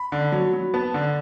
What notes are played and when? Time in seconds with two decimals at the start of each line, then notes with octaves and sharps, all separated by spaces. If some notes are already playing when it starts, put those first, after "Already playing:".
Already playing: B5
0.12 D3
0.32 F#3
0.54 F#3
0.74 B3 A5
0.94 D3